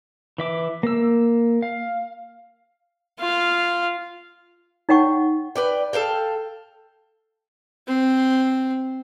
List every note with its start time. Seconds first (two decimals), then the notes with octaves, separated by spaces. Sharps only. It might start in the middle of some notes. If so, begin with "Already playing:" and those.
0.38 E3 E5 D6
0.83 A#3 E6
1.62 F5
3.19 F4 F5
4.89 D#4 C#5 F#5 G5 C#6
5.56 B4 D5 G5
5.93 A4 A#4 F5 G5
7.88 C4